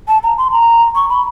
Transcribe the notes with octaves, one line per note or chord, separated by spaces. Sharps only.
A5
A#5
C6
A#5
C#6
B5